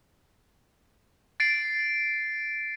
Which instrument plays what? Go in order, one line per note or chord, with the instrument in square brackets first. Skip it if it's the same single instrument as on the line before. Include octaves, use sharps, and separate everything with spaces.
[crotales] A6 C7 D7